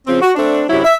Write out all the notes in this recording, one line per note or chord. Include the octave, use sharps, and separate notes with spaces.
C#3 F3 C4
F#4
A3 C4 D4
F#2 C3 F#3 E4
E5